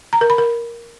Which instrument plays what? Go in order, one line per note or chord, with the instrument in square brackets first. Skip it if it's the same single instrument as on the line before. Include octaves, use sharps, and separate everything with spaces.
[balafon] A#5
A#4
B5
A#4